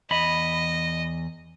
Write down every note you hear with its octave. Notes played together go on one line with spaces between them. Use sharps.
E2 D#5 B5